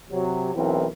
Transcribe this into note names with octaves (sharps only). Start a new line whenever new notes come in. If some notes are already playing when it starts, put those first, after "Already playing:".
C3 F#3
B1 E3 C4 E4 A#4